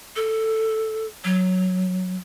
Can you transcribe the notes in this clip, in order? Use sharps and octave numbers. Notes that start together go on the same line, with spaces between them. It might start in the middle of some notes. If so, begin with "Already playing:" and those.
A4
F#3